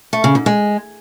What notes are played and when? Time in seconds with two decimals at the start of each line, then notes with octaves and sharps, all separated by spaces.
0.13 A3
0.24 C#3
0.35 G#2
0.46 G#3